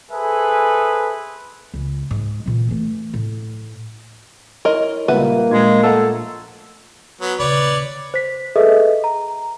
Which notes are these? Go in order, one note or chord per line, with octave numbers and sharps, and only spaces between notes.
G#4 A4 B4 C5 E5 G#5
C#2
G#2
A#2 E3
E3 A3
A2
E4 A#4 C#5 D#5 C6
C#2 A#2 G3 A#3 B4 E5 F#5
A#1 G#3 G#6
A3 A4 F#5 A#5
F#3 B3
D#1 C#3 B4 C#5 D5
C5 B6
G#4 A4 B4 D#5 E5
A#5